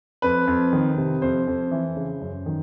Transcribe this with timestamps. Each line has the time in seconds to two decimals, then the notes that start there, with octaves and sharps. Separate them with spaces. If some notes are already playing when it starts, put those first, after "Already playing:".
0.22 F2 B4
0.47 F2
0.73 D#3
0.97 C3
1.22 F2 C5
1.47 F2
1.71 E3
1.96 C#3
2.21 F#2
2.46 D#3